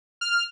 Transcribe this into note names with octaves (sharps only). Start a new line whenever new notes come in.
F6